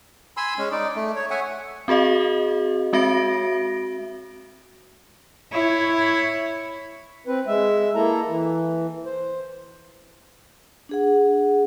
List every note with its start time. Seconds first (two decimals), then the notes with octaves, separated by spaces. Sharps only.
0.37 G#5 B5 C6 E6
0.58 G#3 C#4
0.72 D#4 D5
0.96 A3
1.16 C#5
1.31 C#5 E5 F#5 G#5
1.88 C4 F#4 G#4 D#5 F5
2.93 G#3 C4 F#4 E5 A#6 D7
5.52 E4 C#5
7.27 C4 B4
7.47 G#3 E5
7.95 A#3 E4 A4 A#5
8.28 E3
9.06 C5
10.89 D4 G#4 F#5